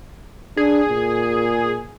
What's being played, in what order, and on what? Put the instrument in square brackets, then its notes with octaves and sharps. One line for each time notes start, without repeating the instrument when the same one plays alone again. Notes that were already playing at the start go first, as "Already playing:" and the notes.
[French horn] D4 [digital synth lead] G#4
[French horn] A#2